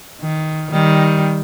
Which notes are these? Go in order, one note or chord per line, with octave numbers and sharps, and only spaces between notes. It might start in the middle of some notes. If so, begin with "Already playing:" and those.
D#3
D#3 G3